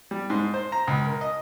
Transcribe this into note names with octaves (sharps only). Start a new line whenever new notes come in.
G3
G#2
C5
A#5
C#2
A#4
D#5